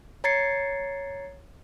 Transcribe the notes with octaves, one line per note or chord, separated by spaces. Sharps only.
C#5 A#5 G#6 A6 C7 C#7